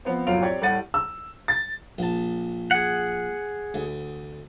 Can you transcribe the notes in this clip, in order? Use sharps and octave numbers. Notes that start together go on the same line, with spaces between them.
F3 B3 C4
F#1 A2 F#3 F4 D7 F7
C4 G4 C#5 D5
A2 G3 A3 F#5 A6 D#7
E6
A6
A#1 A5
G#4 F#5
D2